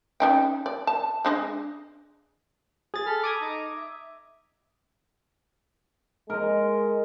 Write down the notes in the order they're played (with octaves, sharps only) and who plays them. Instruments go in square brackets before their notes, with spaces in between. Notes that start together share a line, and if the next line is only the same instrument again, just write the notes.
[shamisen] C#4 D#4 G5
D5
A5
G#3 D4 D#5
[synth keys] G#4 A6
[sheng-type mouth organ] A4 B5 F6
[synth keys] D6 D#6 G#6
[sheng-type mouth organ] D#4 A#5
E5
[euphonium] G#3 [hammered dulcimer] A#4 D#5